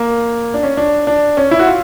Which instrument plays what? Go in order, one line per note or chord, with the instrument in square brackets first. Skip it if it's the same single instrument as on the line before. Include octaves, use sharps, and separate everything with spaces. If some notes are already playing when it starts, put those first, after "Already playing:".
Already playing: [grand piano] A#3
D4
C#4
D4
D4
C#4
E4
F#4
F4